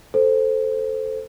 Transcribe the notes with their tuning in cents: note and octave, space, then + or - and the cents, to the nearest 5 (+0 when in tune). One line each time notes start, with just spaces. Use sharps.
A4 +0 C5 +0